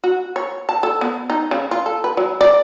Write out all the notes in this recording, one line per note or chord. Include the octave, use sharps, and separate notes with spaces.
F#4
C#5
A5
A4
B3
D#4
C#3
F4
A4
B4
F#3
D5